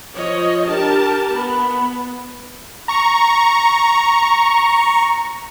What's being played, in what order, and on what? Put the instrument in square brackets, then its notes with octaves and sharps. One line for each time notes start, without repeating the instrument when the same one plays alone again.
[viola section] F3 C#5 D#5
[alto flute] D4 [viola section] G4 A#4 A5
[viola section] B3 [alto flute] B5
[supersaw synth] A#5 C#6